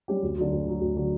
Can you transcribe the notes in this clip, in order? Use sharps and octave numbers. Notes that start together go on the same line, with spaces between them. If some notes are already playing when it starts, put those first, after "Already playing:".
G3 C#4 G4
D2
D3 F#3
D2
D3 F#3
D2
D3 F#3